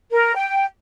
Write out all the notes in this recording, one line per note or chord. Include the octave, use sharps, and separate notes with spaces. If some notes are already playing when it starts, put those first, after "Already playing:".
A#4
G5